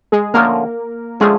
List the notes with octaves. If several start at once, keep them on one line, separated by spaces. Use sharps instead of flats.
G#3 G#4
D3 F3 A3 A#3 C#4 F4 A#4
D3 F3 G#3 A3 C#4 F4 G#4